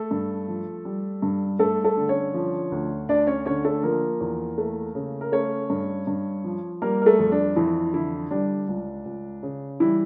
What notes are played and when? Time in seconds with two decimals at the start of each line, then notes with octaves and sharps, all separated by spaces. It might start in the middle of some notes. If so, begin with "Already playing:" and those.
Already playing: A3 A4
0.11 G2
0.48 F3
0.85 G3
1.22 G2
1.59 G2 A3 A4
1.84 A3 A4
1.97 D3
2.09 C#4 C#5
2.34 F3
2.72 D2
3.09 D2 D4 D5
3.27 C#4 C#5
3.45 D3 C#4 C#5
3.65 A3 A4
3.83 F3 A#3 A#4
4.21 E2
4.58 A3
4.95 C#3
5.21 A#4
5.32 A3 C#4 C#5
5.70 G2
6.07 G2
6.44 F3
6.82 G3 A#3 A#4
7.02 A#4
7.06 A3 A4
7.19 F2
7.32 D4
7.56 F2 E3 E4
7.94 D3 E3 E4
8.31 G3 D4
8.68 C#2
9.05 C#2
9.43 C#3
9.80 E3 G3 E4